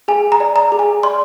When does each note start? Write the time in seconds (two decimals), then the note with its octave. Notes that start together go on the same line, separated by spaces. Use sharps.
0.08 G#4 G#5
0.32 A#5
0.40 D5
0.56 A#5
0.72 G#4
0.79 G#5
1.03 D5 C6